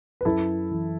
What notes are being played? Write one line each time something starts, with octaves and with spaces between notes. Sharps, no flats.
B4
F#2 E4 A4
E3